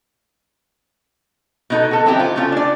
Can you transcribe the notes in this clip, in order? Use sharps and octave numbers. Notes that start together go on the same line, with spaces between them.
B2 D#4 A4
F#4 A4
F#3 C4 C#4 D#4 E4 G4
F4
A3 C4 C#4 F4
D4 D5